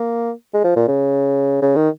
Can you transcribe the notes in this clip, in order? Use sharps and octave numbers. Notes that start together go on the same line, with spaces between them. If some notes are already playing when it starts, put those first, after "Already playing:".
Already playing: A#3
G#3
F3
A#2
C#3
C#3
D#3